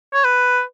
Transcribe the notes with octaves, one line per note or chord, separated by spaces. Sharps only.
C#5
B4